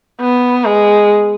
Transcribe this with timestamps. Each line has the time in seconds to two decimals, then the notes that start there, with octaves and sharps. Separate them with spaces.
0.20 B3
0.65 G#3